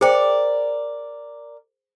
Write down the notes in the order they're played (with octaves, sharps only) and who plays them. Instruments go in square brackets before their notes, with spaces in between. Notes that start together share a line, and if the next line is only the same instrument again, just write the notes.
[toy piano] G#4 C5 G5 [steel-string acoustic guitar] A#4 D5